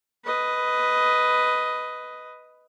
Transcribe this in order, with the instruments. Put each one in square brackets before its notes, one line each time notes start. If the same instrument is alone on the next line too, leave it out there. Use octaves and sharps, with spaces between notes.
[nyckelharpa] B4 D#5